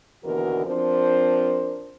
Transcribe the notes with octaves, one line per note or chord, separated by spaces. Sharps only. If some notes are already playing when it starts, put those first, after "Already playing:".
D#2 B2 D3 E3 F#4 A#4
F3 C4 D4 A#4 C5